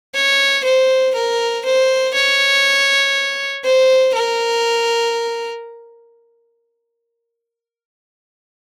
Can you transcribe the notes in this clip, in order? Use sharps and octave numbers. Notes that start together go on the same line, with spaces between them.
C#5
C5
A#4
C5
C#5
C5
A#4